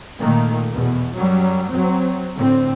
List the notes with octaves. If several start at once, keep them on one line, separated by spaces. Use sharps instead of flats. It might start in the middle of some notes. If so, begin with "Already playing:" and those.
A#2 D#3 A3 A#3
E2 B2
F#2 F#3 G3
F#3 C4
A2 D3 C4